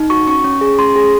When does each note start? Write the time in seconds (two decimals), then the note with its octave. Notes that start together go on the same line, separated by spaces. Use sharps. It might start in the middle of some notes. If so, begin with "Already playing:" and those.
Already playing: D#4
0.10 F#4 C#6
0.27 C#4 C#6
0.44 C#4
0.61 G#4
0.79 C#4 C6
0.96 G#4